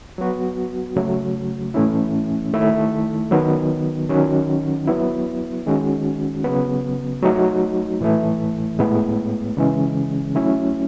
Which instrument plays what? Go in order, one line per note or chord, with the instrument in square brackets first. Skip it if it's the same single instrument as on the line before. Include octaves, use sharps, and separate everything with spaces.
[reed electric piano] F#3 B3 F#4
C#3 F#3 A3
A2 E3 A3 C#4 E4
D#3 A3 E4
D#3 F#3 B3
D#3 F#3 C#4 F#4
F#3 B3 E4
D#3 G#3 C#4 F#4
C#3 F#3 B3
F#3 A3 D#4 F#4
A2 E3 A3 E4
A2 G#3 B3
C#3 E3 G#3 C#4
F#3 A3 C#4 E4